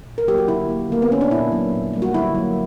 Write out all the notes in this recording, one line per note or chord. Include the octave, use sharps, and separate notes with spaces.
A#2
A#4
F#3 A#3 G4
F#4
D3 E4
A#3
D3 A#3
B3
A#3 C#4
D4
A#2 E4
F#3 A#3
A#2
G3 A#3
F#4
D3 E4
F#3 A#3